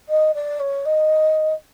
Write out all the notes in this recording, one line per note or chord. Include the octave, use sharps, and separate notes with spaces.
D#5
D5
C#5
D#5